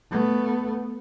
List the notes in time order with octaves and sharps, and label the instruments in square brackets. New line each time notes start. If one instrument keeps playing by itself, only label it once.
[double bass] A3 B3